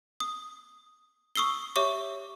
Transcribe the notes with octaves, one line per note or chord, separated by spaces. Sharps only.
D#6
C#6 D#6 E6 C7 G7
G4 C#5 E5 C#6 D6